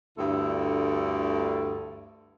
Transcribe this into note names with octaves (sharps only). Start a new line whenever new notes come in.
D2 G2 D3 E4 A4